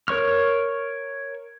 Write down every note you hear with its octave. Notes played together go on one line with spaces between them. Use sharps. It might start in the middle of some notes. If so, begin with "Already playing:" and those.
A#4 C#5 C#6 F6